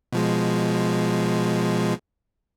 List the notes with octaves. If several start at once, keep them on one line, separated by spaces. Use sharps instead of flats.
B2 F3 G#3